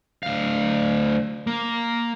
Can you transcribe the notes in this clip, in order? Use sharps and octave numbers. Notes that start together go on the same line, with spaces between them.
D2 F5
A#3